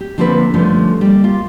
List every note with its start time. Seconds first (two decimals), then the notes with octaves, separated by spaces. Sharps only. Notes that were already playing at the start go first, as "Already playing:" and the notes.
0.01 G4
0.18 D3 F3 A#3 C4 A4 B4
0.54 D3 F3 G3 A3 C#4
1.01 G3 A#3
1.24 F4